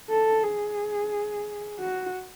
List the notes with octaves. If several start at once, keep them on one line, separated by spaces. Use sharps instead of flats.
A4
G#4
F#4